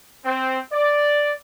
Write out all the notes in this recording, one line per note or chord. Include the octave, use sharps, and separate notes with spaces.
C4
D5